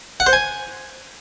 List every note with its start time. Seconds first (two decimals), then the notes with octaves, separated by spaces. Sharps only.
0.20 F#5
0.27 C5
0.33 G#5